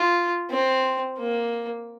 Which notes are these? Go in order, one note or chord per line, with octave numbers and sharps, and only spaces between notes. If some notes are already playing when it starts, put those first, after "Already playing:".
Already playing: F4
C4
A#3